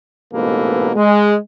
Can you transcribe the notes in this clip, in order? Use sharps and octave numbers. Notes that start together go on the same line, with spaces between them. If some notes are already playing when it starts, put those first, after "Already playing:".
A1 G#2 B2 A#3 A4 B4
G#3